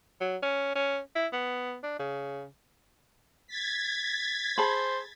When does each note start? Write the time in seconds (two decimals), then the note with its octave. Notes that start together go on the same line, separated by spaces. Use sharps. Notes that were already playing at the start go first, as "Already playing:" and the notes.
0.20 F#3
0.42 C#4
0.75 C#4
1.15 E4
1.33 B3
1.83 D4
1.99 C#3
3.47 G#6 A6 B6
4.58 G#4 C5 A5 B5